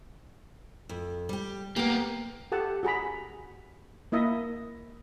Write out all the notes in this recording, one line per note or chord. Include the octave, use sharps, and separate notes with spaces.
F2
G3 G4
A#3 B3 G4 A#4
G4 A4 F#5 A5
F#4 G#4 A#5 B5
A#3 E4 D#5 E5